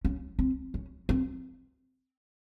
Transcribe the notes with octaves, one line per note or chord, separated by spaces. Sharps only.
C#4
C4
C#4
C4